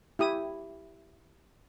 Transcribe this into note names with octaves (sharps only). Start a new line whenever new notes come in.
E4 G4 D#6